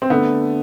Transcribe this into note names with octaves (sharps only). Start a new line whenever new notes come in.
C4
D3 A3 B3